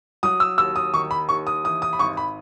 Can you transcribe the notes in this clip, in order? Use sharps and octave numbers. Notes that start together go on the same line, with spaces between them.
F#3 D#6
E6
D#2 E6
D#6
D#3 C#6
B5
D#2 C#6
D#6
E3 D#6
D#6
B5
G#1 C#6
B5